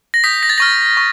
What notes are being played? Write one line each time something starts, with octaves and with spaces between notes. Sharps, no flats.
A#6
D#6 G6 B6
A#6
A6
C#6 F6 A#6
C#6